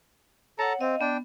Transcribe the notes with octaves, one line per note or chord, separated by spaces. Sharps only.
A4 C#5 F#5 A5 A#5
C4 D#5 F5
B3 D4 G5